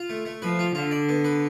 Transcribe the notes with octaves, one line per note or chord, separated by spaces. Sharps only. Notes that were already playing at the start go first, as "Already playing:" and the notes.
Already playing: F4
A3
A3
F3 B4
F4
D3 F4
D5
B3
B4